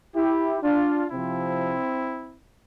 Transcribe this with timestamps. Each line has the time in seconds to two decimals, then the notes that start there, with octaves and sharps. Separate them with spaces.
0.16 E4 G4
0.63 D4 F4
1.10 C3 F3 C4 E4